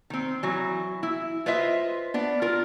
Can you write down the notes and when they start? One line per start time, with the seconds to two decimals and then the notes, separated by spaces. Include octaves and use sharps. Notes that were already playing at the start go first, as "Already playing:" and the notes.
0.10 D#3 C4
0.43 E3 F#3
1.03 E4
1.46 F4 B4 C5 D#5 E5
2.14 B3 D4
2.42 F4 A#4